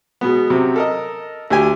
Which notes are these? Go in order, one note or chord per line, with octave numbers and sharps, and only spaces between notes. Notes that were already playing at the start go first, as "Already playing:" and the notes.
B2 G#3 B3
F#2 C3
A4 A#4 D#5
D2 G4 G#5